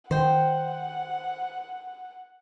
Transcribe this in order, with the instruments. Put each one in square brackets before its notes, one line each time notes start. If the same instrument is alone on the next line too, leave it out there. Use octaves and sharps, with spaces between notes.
[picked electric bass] D#3 [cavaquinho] C5 G5 [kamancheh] F#5